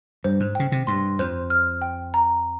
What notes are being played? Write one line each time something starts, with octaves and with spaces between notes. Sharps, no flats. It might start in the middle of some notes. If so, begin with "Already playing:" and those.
G2 C5
G#2
C#3 G5
C3
G2 C6
F2 C5
F6
G5
A#5